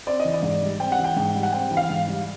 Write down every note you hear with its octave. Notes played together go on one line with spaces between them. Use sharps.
C4 D5
D#5
E3
D5
G#2
G3
C4 G5
F#5
E3
G5
G#2
G3
F#5
C4 G5
E3
F5
G#2
G3